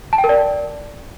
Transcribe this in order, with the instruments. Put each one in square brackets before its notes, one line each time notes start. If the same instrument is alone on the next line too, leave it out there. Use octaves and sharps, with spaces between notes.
[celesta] A5
G5
A#4
D5